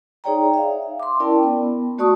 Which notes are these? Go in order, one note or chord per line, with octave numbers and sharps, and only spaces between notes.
D#4 G#4 C#5 D5 G5 A#5
E5 F5
C6 D6
C#4 E4 A#4 D5 G5 A5
B3
A3 F#4 D5 A5 C#6 D#6